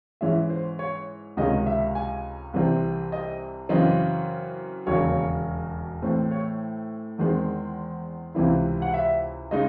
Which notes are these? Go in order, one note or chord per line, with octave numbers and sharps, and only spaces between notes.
G#2 E3 G#3 C#4 E5
C5
C#5
C#2 C3 D#3 G#3 C#4 D#5
E5
G#5
C2 C3 E3 C4
D#5
F#2 C#3 E3 C4 D#5
E1 D#2 C#3 F#3 C#5
A2 E3 C4 C5
C#5
E2 D#3 G#3 C4 D#4
C#2 C3 E3 C4 E4
F#5
E5
C#3 G#3 D#4 D#5